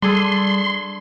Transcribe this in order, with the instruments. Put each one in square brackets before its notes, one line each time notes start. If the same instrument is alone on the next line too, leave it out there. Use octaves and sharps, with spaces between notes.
[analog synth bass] G3 [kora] D4 G#4 A4 [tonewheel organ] C6